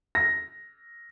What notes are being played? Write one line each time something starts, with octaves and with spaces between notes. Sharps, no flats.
A#6